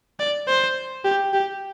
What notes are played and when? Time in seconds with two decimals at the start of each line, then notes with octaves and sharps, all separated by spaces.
0.20 D5
0.48 C5
1.04 G4
1.34 G4